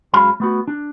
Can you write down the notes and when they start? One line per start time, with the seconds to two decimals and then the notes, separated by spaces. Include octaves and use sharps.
0.14 F#2 F#3 G#3 F5 B5
0.40 A3 B3 F#4
0.68 D4